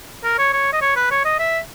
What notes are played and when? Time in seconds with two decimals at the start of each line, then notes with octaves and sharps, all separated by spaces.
0.24 A#4
0.38 C#5
0.53 C#5
0.73 D#5
0.82 C#5
0.96 B4
1.11 C#5
1.25 D#5
1.39 E5